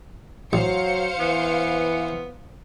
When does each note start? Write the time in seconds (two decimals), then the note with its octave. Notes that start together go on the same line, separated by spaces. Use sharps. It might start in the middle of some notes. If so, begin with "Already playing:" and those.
0.53 A1 F#3 C5 F5 C#7
1.19 E3 B3